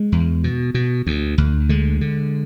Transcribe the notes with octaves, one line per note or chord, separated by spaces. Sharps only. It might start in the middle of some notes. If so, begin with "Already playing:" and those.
Already playing: G#3
E2
B2
B2
D2
D2
D3 G#3
D3